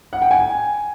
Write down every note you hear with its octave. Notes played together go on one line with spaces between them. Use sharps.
F#5
G5
G#5